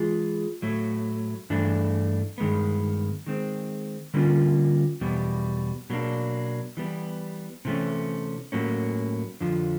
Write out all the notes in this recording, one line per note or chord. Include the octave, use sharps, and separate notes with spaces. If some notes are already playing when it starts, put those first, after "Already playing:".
Already playing: E3 G#3 F4 G#4
A2 F#3 A3
G2 E3 A3 D4
G2 D#3 G#3 B3
D#3 G#3 C4
D3 G3 A#3 C#4 F4
E2 B2 G3
B2 F#3 A#3 D4
E3 G3 B3
C3 E3 A3 C#4
A2 F#3 A#3 C#4
F2 D3 F3